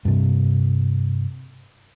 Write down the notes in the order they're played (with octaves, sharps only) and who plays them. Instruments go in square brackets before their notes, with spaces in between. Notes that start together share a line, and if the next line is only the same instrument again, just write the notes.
[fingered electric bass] G2 C3